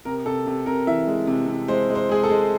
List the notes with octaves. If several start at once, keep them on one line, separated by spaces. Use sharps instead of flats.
C3 A#4
C3 A4
C3
C3 A#4
E3 E5
G#3
C3
C3
G#3 C5
G#3
C5
G#3 G#4
A4
G#3